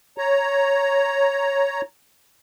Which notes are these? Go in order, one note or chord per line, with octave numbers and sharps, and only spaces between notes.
C#5 A#5